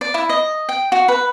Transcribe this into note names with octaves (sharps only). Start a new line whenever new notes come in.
D5
E4
D#5
G5
F#4
B4